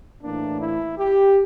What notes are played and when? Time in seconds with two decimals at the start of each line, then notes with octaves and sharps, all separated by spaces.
0.22 A2 E3 A#3 D4
0.61 E4
0.98 G4